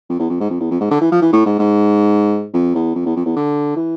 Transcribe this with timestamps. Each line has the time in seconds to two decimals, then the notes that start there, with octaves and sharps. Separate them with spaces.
0.09 F2
0.19 E2
0.30 F2
0.40 G#2
0.50 F2
0.60 E2
0.71 F2
0.81 G#2
0.91 D3
1.01 E3
1.12 F3
1.22 E3
1.32 A2
1.46 G#2
1.59 G#2
2.54 F2
2.75 E2
2.95 F2
3.06 E2
3.16 F2
3.26 E2
3.36 D3
3.76 E3